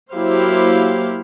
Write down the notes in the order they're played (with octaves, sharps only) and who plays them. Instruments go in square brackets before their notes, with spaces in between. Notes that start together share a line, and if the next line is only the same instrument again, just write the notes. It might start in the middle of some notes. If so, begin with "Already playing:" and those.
[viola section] F#3 A#3 E4 G4 C5 F5